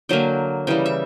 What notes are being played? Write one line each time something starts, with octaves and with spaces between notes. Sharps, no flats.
D3 F#3 A#3 G5
C#3 E3 G3 G5
E5